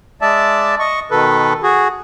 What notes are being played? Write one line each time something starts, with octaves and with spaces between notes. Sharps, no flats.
G#3 D5 E5 A5
D#5 C#6
B2 D#3 A4 B4
F#4 G#4